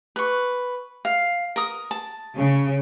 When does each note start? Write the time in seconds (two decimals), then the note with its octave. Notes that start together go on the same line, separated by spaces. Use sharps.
0.16 B4 C#6
1.05 F5
1.56 A#4 D#6
1.91 A5
2.36 C#3